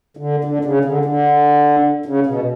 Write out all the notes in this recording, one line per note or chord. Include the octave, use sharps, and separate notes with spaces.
D3
D3
C#3
D3
D3
C#3
B2